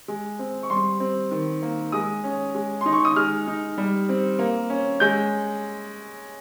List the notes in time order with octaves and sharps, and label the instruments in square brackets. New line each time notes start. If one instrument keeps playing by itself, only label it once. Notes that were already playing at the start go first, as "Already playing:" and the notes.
[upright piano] G#3
C4
C#6
G3 C6
C4
D#3
A#3
G#3 D#6
C#4
G#3
D#4 C6
C#6
D#6
G#3 F6
D#4
G3
C4
A#3
C#4
G#3 G6